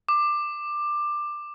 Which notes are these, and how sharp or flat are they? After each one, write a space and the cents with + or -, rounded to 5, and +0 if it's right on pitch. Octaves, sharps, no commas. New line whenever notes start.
D6 +15